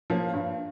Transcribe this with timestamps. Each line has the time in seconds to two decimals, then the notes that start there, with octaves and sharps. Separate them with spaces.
0.10 F3 A#3 C#4
0.33 G2